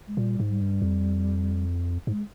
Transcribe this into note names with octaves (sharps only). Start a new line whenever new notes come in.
G#3
A#2 G3
G#2
G3
G2
F2
G#2
G#3